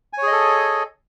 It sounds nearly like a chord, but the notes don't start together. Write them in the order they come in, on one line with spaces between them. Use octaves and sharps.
G#5 C#5 G#4 D#5 A4